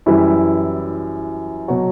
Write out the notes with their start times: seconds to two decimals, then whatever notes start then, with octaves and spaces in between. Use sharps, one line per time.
0.06 F#2 E3 G3 E4
1.68 B2 F#3